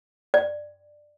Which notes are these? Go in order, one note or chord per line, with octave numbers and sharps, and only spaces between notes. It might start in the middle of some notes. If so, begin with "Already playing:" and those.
D5